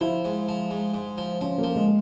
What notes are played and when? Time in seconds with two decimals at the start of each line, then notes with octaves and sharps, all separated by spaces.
0.01 F3 E4
0.25 G#2
0.48 F3
0.71 G#2
0.94 G#2
1.18 F3
1.41 F3 C#4
1.58 A#3
1.63 F3
1.76 G#3